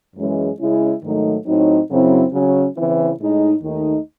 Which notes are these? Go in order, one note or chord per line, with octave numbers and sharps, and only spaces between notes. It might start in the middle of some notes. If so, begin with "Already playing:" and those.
F#2 E3 G#3 C#4
C#3 G#3 C#4 E4
G#2 D#3 F#3 A3 D#4
A2 F#3 C4 D#4
F#2 C#3 F#3 C4 E4
C#3 F#3 C#4
C#3 E3 C4 E4
A2 G#3 D#4
D#2 D#3 A3 D#4